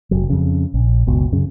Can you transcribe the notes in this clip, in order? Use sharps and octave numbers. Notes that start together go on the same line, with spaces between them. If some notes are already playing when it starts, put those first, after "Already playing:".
F1 F#3
F2 C#3
A#1
F#1 C#2 B2
F#2 C#3